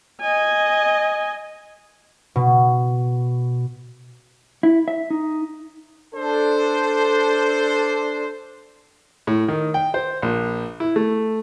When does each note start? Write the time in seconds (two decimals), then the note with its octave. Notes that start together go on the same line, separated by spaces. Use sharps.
0.22 D#5 G#5
2.36 B2
4.63 E4
4.88 E5
5.10 D#4
6.14 D4 A4 C5
9.27 A2
9.48 D#3
9.74 G5
9.94 C5
10.22 A#1
10.80 E4
10.96 A3